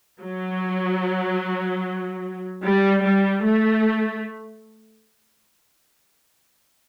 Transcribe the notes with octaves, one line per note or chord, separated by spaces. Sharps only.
F#3
G3
G3
A3